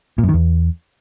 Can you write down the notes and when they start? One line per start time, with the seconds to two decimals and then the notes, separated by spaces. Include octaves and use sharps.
0.18 A#2
0.23 F#2
0.29 D#3
0.34 E2